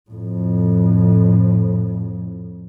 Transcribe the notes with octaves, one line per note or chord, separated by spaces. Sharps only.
F2 A2